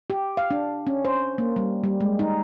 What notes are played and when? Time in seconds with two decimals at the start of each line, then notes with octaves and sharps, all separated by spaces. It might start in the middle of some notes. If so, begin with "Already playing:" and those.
0.10 G4
0.37 F5
0.51 D4
0.87 C#4
1.05 C5
1.38 A#3
1.56 G3
1.84 G3
2.00 G#3
2.19 D#4